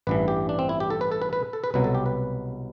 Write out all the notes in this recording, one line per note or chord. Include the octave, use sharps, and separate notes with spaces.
A1 G2 E3 B4
G4
D4
C4
E4
G4
A4
B4
A4
B4
B4
A4
B4
C2 B2 F#3 B4
A4
G4
B4